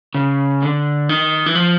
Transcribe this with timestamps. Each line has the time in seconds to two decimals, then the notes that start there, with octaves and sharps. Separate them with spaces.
0.15 C#3
0.62 D3
1.09 D#3
1.46 E3
1.55 F3